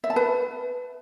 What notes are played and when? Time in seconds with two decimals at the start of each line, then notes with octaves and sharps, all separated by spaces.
0.04 E5
0.10 A5
0.16 B4